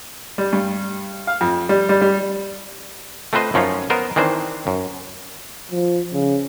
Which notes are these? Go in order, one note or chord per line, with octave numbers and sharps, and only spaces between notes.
G3
G2
F5
F2
G3
G3
G3
A3 C4 F4 B4 C5 D#5
F#2 F3 C#4 D#4 F4
B3 A#4 C5 D#5
D#3 E3 C4 D4 C5
F#2
F3
C#3